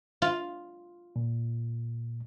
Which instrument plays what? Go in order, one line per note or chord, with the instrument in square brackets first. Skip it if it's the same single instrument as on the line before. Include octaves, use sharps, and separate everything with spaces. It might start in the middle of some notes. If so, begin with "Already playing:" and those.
[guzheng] F4
[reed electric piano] A#2